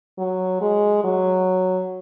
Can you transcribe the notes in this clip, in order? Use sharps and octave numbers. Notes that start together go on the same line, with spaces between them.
F#3
G#3
F#3